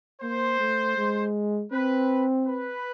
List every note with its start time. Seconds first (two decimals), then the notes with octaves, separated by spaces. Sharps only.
0.22 A#3 C5
0.60 A3
0.98 G#3
1.72 C4 B4
2.47 B4